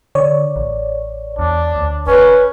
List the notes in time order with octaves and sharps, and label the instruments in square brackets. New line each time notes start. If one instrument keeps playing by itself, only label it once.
[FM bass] D3 [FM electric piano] C#5 D5
[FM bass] A1
[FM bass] E2 [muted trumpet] D4
[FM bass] D2
[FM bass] F1 [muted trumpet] C#4 [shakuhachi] B4